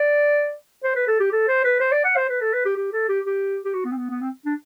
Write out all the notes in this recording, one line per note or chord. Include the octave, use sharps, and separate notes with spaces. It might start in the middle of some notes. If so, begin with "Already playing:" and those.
Already playing: D5
C5
B4
A4
G4
A4
C5
B4
C5
D5
F#5
C5
B4
A4
B4
G4
G4
A4
G4
G4
G4
F#4
B3
C4
B3
B3
C4
D4